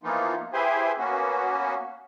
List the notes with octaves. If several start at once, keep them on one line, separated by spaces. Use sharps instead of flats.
E3 F3 A#3 B3 D#4 F4
E4 G4 G#4 B4 C5 G#5
A#3 B3 C#4 F#4